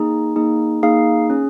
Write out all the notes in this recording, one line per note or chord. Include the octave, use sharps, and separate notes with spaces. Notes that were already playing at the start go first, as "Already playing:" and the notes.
Already playing: A#3 D#4 G#4
A#3 D#4 G#4
A#3 D#4 G#4 F5
C#4 G#4